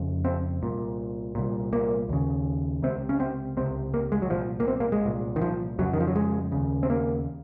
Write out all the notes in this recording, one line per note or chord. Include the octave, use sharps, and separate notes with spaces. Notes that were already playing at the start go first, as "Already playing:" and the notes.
Already playing: F2 C#3
C4
C2 A#2
C2 A#2
A#3
D#2 C#3
C#2 C3 C4
C#4
C4
C#2 C3 C4
A#3
G#3
F#3
C2 A#2 F3
A#3
C4
A#3
G#3
C2 A#2
D#3
F3
F2 C#3 F#3
D#3
F3
F#3
G#3
D#2 C#3
C4
A#3